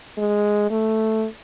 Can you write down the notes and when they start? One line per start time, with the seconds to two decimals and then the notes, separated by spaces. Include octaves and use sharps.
0.18 G#3
0.71 A3